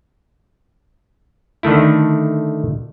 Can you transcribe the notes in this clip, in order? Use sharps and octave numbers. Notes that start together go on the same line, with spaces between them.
D3 D#3 A3 E4